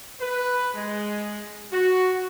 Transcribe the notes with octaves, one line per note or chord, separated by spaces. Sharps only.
B4
G#3
F#4